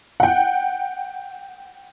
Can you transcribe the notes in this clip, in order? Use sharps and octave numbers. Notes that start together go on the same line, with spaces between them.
F#5 G5